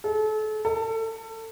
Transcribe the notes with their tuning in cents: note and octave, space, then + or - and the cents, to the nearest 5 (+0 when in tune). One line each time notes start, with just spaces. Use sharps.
A4 -35
A4 +30